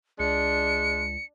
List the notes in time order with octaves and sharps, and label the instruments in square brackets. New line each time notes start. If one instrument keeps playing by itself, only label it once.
[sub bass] C#2 [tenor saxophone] G#3 [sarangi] D4 [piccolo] C#7